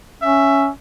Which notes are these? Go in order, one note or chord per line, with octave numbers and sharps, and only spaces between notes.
C#4 E5